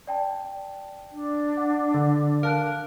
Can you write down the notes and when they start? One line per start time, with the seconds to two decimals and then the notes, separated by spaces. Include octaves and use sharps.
0.07 D5 G5 A5
1.12 D4
1.57 F#5
1.94 D3
2.43 A#4 F5 A5 F#6